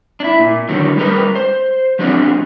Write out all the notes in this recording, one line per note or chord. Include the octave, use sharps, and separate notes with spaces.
D4 E4
A#2
E2 D3 D#3 F#3
G3 G#3 A#4 B4
C5
F3 F#3 G#3 B3 C4 D4